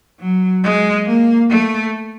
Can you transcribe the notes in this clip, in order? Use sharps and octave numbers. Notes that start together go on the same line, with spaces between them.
F#3
G#3
A#3
A3